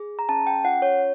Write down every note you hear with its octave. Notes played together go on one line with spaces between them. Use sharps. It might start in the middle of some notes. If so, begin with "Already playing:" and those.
Already playing: G#4
A#5
C#4 A5
G5
F4 F#5
C#5